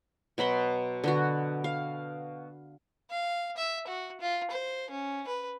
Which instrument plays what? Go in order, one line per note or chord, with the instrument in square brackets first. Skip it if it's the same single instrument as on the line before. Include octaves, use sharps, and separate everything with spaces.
[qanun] B2 F#3 B5 C6
D3 B3 F#4
F5
[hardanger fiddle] F5
E5
F#4
F4
C5
C#4
B4